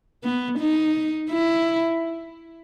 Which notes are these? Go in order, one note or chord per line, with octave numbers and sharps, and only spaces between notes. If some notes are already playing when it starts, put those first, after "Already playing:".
B3
D#4
E4